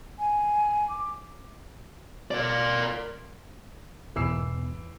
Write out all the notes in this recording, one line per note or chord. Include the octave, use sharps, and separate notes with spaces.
G#5
D6
A#4 D5
E2 G#2 B2 E3 E6 C7